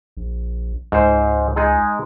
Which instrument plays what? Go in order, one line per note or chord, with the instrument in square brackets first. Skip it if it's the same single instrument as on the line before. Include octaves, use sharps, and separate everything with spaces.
[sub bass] A#1
[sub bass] C#2 [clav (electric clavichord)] G#2 C5
[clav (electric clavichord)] G#3 D#4 G#4